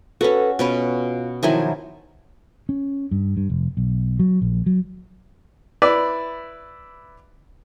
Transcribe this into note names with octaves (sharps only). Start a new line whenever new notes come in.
C#4 F#4 A4 B4
B2 C#4 F4 B4
D#3 F3 F#3 E4 A#4 G#5
C#4
G2
G2
F1
B1
F#3
A#1
F#3
E4 B4 D5 E5